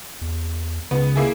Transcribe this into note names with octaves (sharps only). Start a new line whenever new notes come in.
E2
C#2 B3
D3 A#3 E4 G#4